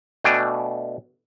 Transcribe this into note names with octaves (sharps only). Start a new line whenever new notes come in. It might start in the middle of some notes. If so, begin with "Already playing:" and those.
B2 A3 D4 G5 G#5